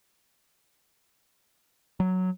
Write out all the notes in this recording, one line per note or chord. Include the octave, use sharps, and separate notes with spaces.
F#3